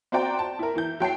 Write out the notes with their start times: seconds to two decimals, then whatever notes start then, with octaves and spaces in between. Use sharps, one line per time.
0.12 C4 F#4 C5 D5 G5 A#5
0.39 A5
0.59 E4 A#4
0.75 E3 G6
1.00 F#3 G5 A5 C7